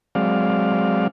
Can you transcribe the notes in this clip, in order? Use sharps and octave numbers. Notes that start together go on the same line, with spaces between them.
F#3 G#3 C4 D5 F5